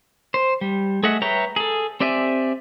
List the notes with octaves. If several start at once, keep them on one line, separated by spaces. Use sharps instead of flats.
C5
G3
A3 G#4 D#5 E5 F#5
B4 C#5 E5 G5 A#5
G#4 A4
C4 G4 D5 E5 G#5